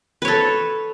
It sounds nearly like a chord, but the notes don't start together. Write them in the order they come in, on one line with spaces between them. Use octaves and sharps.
B4 C#5 A4